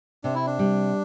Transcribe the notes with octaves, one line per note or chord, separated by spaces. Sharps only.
C3 D4
E4
D4
G3